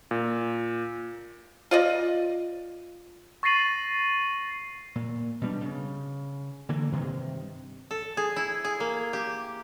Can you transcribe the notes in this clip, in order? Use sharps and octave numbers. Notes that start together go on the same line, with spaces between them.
A#2
F4 D5 D#5
C#6 A6 A#6 C7 D#7 F#7
A#2
B2 G3 D4
C#3
D3 E3 A#3
G2 C3 D#3
A4
G#4
E4
G#4
A#3
G4